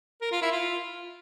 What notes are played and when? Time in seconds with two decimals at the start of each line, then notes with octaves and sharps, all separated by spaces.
0.21 A#4
0.31 F4
0.42 E4
0.52 F4